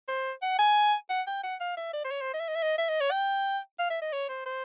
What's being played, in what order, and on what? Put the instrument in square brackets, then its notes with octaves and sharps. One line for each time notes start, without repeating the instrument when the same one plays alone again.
[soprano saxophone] C5
F#5
G#5
F#5
G5
F#5
F5
E5
D5
C5
C#5
C5
D#5
E5
D#5
E5
D#5
E5
D#5
C#5
G5
F5
E5
D#5
C#5
C5
C5